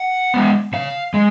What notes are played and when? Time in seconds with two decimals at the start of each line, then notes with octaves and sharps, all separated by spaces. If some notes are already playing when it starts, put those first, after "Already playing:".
Already playing: F#5
0.34 G#3 B3
0.73 C#3 F5
1.14 G#3